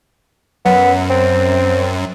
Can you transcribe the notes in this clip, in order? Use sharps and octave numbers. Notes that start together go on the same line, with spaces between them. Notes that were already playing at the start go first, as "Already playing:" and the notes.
F#2 B3
C4